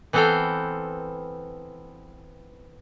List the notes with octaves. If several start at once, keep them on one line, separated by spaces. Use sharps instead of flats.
E3 B3 C4 A4 F5 G5